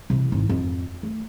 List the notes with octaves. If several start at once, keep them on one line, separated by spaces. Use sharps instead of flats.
C3 E3
G#1 E4
F2
A3